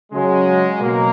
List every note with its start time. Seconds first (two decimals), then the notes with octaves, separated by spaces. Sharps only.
0.12 C#3 F#3 G#3
0.80 B2 F#3 A#3